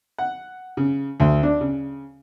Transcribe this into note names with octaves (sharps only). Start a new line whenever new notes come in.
F#5
C#3
D2
D4
C#3